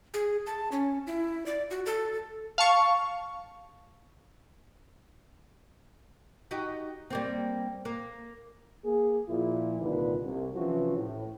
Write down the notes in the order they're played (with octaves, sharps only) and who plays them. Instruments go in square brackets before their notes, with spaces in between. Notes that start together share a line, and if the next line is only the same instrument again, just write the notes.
[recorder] G#4
A5
C#4
E4
D5
F#4
A4
[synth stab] F5 A5 C#6
[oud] D#4 F#4 G4
G3 A#3 C4
A#3
[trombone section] A#3 G#4
A#2 F3 E4
C2 A#2 D3 D#3 B4
C2
C3 E3 F3 C#4 F#4
A2